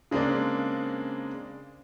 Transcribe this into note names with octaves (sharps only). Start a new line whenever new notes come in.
C#3 G#3 A#3 C4 D4